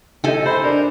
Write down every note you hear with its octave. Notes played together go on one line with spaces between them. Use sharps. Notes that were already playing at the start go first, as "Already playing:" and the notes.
E4 G4 A4 D#5 G#5
C5 B5
D4 A#4